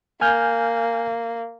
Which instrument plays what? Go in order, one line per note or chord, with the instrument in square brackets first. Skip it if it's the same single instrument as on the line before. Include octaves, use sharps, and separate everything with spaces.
[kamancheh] A#3 [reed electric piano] G#5 F6 G6